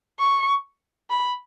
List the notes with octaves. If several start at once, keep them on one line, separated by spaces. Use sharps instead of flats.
C#6
B5